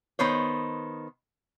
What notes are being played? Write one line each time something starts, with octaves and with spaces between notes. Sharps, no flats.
D#3 B3 C5 C#5